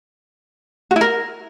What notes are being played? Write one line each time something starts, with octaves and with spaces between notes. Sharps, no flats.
F#4
E4
A#4